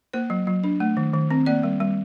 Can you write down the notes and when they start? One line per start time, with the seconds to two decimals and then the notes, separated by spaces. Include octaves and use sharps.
0.13 A#3 C5
0.30 F#3
0.47 F#3
0.64 D4
0.80 A3
0.97 D#3
1.14 D#3
1.31 C4
1.46 A#3 D5
1.63 G3
1.80 G3